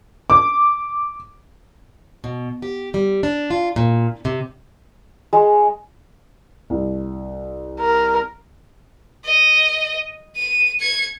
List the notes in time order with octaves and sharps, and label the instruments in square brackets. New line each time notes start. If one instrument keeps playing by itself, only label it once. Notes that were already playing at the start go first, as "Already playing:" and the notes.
[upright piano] D6
[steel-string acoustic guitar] B2
G4
G3
D4
F4
A#2
C3
[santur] G#3
[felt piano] C2
[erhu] A#4
[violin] D#5
D#7
G#6 C#7